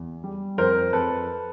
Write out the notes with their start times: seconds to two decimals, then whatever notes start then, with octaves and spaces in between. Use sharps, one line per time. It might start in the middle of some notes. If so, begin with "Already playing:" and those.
Already playing: E2
0.24 G3
0.58 F2 A#4 C5
0.93 F2 A4 B4